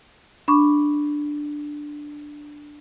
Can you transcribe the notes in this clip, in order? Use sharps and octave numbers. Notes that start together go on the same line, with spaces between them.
D4 B5 C#6 D6